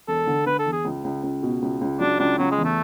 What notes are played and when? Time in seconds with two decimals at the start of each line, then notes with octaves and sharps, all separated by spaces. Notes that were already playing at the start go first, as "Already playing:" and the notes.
0.08 E1 A4
0.27 D3
0.46 D3 B4
0.59 A4
0.66 E2
0.72 G#4
0.85 C#2
1.04 C#2
1.23 C#2
1.43 B2
1.62 C#2
1.81 C#2
2.00 F#3 D4
2.19 C#2 D4
2.39 C#3 F#3
2.51 G#3
2.58 E2
2.65 A3